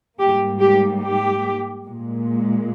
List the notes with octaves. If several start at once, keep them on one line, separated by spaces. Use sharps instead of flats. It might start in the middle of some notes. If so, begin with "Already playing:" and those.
G#2 G3 A#3 G4
G4
G4
A#2 G#3